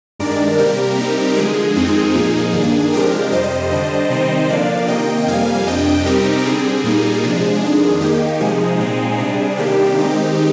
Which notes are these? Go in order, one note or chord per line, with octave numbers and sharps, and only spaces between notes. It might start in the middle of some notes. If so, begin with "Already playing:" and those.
G2 D#3 G#3 D4 A#4 D5
C3 G3 A#3 G4 A#4
C3 G3 C4 D#4
D3 F3 G#3 G#4
F2 D#3 G#3 C4 D#4
A#2 F3 A#3 D#4
G2 D#3 A#3 D4
C3 F3 G#3 D4 G4 A#4
F2 C3 G3 C5 D#5
D3 G3 D4 C5 D#5
C3 D#3 G3 C4 D#4 C5 D#5
D3 F3 A#3 D4 D5 F5
C3 D#3 A#3 D#5 G5
F2 C3 G3 A#3 F5 G#5
F2 C3 G3 D4 D#5 G5
C3 G3 C4 D#4 G4 A#4
D3 G3 C4 G#4
A#2 G3 A#3 D#4
C3 F3 G#3 D4
F2 D#3 G#3 D4
D#3 A#3 D#4 G4
C3 F3 G#3 D#4 G#4
A#2 G#3 C4 D#4
C3 G3 D4 G#4
C3 D#3 G3 A#3 D4 G4
D#3 G#3 C4 D#4